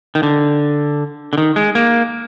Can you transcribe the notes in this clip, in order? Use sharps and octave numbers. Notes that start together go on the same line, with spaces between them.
D#3
D3
D3
D#3
G#3
A#3